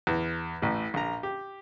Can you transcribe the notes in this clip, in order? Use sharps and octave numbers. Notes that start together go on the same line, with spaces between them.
E2
A1 A2
A#1 A#5
G4